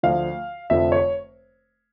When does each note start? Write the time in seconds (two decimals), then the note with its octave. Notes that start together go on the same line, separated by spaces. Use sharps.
0.03 D2 D3 F3 F5
0.70 F1 F2 D3 F3 E5
0.92 C#5